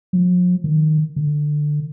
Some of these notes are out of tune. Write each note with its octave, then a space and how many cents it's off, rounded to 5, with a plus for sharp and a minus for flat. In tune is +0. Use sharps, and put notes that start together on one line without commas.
F3 +45
D#3 -10
D3 +15